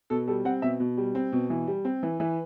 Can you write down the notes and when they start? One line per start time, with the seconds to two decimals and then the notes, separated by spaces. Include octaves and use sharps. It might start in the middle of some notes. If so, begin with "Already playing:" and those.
0.10 B2 A4
0.27 G3 A4
0.45 C4 F#5
0.62 B2 E5
0.80 B2
0.97 G3
1.15 C4
1.32 B2
1.50 E3
1.68 G3
1.85 C4
2.03 E3
2.20 E3 B4